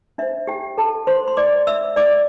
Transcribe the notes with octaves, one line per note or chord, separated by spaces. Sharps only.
D4 C5 E5
G4 G5
A4 A5
C5 C6
C6
D5 D6
E5 E6
D5 D6